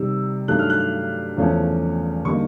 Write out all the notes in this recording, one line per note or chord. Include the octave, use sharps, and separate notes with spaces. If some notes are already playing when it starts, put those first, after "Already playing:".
Already playing: C3 D#3 G3 E6
G2 D#3 F#3 A3 F#6
F6
F#6
E2 C#3 F3 A3 C#4
D3 G3 A#3 D#4 C#6